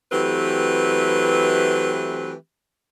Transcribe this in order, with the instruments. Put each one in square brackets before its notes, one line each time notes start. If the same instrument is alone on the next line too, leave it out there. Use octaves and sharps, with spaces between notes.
[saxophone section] E3 F#3 A3 C4 G4 B4